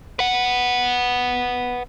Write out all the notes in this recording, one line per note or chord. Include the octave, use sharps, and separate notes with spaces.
B4 F#5